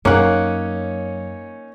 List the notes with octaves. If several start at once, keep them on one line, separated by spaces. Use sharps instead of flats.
F#2 A#3 C#4 D#4 C#5 F#5